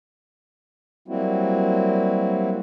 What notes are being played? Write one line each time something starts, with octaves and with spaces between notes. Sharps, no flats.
F#3 G3 A#3 C4 E4 F#4